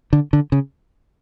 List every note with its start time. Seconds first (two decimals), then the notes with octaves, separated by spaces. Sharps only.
0.13 D3
0.33 D3
0.52 C#3